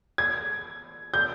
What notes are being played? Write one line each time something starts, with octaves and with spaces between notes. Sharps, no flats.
G#6
G6